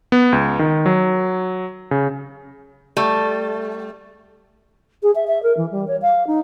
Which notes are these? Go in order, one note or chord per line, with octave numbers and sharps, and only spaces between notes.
B3
C#2
D#3
F#3
C#3
G3 A3
G#4
E5
E5
A#4
E3
G3
C#5
F5
D#4